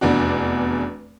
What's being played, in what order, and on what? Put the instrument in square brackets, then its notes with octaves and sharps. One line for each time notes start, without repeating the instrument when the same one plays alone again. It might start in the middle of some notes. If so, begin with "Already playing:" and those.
[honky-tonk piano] F1 E2 D4 F#4